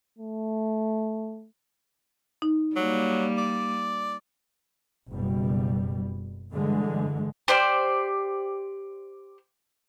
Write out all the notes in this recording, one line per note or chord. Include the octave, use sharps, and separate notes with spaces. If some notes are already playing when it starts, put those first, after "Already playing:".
A3
D#4
F#3 G3 A#3
D5
F#1 B2 G3
G2 D3 E3 G#3
G4 C5 D5 F6